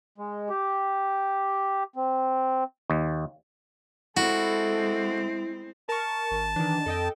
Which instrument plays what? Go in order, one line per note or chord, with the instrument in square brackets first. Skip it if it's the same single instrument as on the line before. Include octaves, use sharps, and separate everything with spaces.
[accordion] G#3
G4
C4
[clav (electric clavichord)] D#2
[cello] G#3 C4 [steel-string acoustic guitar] E4 [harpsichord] F#4 [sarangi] A4
[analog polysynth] A#4 C#6 [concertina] A5
[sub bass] G#1
[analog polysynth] D#3 D4 [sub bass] E3
[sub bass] F2 [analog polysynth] A4 D#5 G5